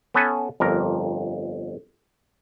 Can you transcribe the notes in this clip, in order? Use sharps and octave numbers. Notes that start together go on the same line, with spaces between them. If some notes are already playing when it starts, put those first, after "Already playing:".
B3 C#4 A4 B4 G#5
G1 F2 A#4